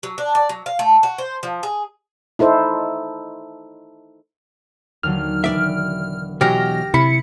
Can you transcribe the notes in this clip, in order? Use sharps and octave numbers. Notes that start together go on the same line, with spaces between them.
F#3
D4
D5
F#3
F5
A3
F#4
C5
F3
G#4
D#4 E4 A4 C5
D#2 D3 F#3 F6
E1 D5 E5 D7
B2 E3 F#3 G4 F6 G#6 A#6
C3 E4 B5 C#7